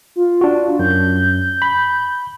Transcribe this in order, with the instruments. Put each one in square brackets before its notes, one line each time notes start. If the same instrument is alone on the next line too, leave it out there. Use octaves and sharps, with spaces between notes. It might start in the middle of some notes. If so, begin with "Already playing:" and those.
[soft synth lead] F4
[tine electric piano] D4 F#4
[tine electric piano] F#2 [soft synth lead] G6
[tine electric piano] B5